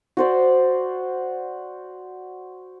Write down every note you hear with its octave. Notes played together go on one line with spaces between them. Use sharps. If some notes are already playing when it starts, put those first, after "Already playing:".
F#4 C5 D5